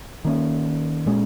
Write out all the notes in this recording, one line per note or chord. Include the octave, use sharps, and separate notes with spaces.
D#3 A#3 C#4
A#2 G#3 C#4